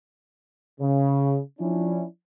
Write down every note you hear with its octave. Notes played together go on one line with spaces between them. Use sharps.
C#3
F3 C#4 D4 E4